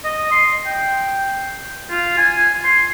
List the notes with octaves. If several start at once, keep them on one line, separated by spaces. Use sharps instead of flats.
D#5
C6
G5
F4
G#5
C6